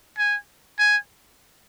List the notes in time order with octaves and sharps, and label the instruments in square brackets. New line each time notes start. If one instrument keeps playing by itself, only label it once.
[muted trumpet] G#5
G#5